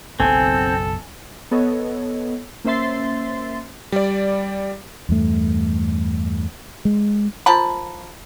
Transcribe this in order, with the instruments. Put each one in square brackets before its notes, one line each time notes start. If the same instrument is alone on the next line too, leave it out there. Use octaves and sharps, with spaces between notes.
[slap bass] F#1 B1 F#2 [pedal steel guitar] C4 [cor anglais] A4 [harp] G#5
[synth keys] B3 A4 C#5 D#5
A#3 C#4 C5 E5 C6 A6
[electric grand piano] G3 D5
[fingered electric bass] E2 G2 A3
G#3
[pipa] F3 A#4 A5 B5